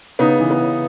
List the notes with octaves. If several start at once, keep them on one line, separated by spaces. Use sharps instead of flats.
C#3 B3 D#4
E3
B3
C#3